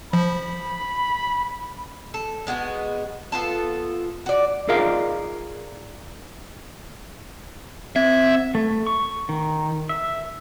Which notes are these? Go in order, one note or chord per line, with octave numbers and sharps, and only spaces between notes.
F3 B5
A4
G#3 B3 F4 F#4
B3 F4 A4
F#4 D5
D#4 F4 G#4 A#4 D5 F5
C4 E5 G#6
A3
C#6
D#3
E5